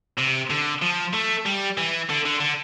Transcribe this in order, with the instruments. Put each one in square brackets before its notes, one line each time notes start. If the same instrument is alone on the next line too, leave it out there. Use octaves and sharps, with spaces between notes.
[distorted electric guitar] C3
D3
F3
A3
G3
E3
D3
D3
D3